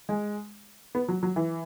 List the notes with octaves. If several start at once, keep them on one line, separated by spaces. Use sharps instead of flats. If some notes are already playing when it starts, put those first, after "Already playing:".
G#3
B3
F#3
F#3
E3